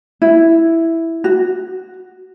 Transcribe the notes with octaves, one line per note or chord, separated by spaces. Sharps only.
E4
F#4